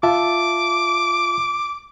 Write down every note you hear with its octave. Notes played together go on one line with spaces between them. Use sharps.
F4 E5 A5 D6